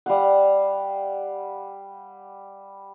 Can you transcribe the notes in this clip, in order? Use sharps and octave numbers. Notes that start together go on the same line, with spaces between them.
G3 F5 F#5